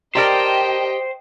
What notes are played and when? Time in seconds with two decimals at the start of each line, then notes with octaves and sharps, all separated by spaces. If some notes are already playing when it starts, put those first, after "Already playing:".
0.15 G4 A#4 C5 D5 D#5 G5 A5